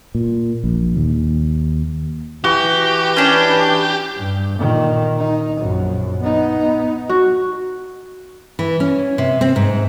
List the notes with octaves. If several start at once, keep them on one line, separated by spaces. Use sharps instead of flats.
A#2
A#1
D#2
E3 F#4 G4
C#4 D4
G2
A#2 D#3
D#4
A#1 F#2
B3 D#4
F#4
E3
C#4
C3
C4
G#2